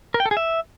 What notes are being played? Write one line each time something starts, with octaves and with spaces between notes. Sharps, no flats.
A#4
G5
A4
G#4
E5